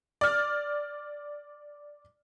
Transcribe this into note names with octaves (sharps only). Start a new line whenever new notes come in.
D5 F6